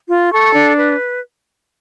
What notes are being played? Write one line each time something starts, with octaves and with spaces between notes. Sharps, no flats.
F4
A4 C#6
D4
B4